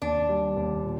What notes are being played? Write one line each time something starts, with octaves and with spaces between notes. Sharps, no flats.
D#2 D4
G3
D#2
A#2